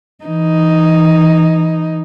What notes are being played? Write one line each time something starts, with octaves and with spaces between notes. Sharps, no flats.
E3 D#4